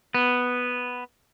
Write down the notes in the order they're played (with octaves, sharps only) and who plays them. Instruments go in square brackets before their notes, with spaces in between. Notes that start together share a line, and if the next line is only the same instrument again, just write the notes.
[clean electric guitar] B3